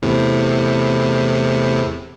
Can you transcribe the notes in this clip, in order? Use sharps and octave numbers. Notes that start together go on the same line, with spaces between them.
E2 A2 C3